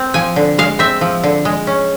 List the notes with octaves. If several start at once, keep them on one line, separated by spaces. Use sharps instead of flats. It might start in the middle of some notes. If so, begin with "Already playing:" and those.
Already playing: C4
F3 G#5
D3
G#3 F5
C4 E5
F3
D3
G#3
C#4